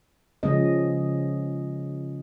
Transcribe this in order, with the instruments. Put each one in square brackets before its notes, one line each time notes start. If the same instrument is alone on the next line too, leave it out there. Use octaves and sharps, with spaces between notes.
[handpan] C#3 F3 G#3 C#4 D#5